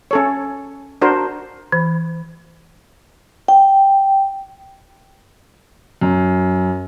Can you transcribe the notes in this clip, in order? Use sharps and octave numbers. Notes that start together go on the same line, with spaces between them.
C#4 A4 C#5
D4 F#4 A#4 C5
E3
G5
F#2